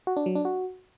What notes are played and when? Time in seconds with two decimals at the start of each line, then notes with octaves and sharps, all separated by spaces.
0.07 F#4
0.17 D4
0.26 F#3
0.35 D4
0.45 F#4